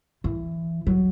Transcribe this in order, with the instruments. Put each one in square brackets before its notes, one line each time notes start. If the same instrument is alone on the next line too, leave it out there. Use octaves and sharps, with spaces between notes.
[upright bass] E3
F#3